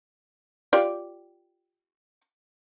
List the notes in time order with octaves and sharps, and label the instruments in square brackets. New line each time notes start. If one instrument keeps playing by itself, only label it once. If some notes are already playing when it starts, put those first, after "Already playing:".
[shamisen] F4 G4 D5